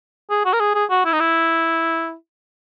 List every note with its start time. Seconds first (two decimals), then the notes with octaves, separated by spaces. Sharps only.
0.30 G#4
0.45 F#4
0.53 A#4
0.60 G#4
0.74 G#4
0.90 F#4
1.05 E4
1.13 D#4
1.20 E4